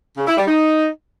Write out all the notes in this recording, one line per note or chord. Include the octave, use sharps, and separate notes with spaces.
C#3
E4
G3
D#4